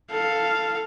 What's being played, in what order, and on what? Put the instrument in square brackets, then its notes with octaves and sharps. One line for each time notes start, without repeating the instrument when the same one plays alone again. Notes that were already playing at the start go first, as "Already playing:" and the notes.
[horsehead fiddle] A4 F5